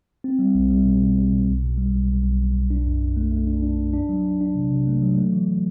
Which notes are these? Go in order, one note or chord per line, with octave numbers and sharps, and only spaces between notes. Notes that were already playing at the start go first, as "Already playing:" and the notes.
C4
G3
B1
G3
B2
B2
B1
B2
B1
B2
G3
B1
B1
B1
B1
B1
D4
F#2
F#2
A3
A3
D4
D4
F#2
D4
F#3
D4
D4
C3
C3
A3
F#3
A3
E3